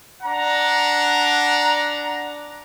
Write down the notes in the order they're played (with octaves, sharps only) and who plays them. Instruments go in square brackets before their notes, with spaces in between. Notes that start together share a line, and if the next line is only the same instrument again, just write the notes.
[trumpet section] D4 F#5 A#5